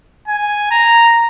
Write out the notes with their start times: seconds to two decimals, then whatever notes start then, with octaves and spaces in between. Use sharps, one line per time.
0.28 G#5
0.71 A#5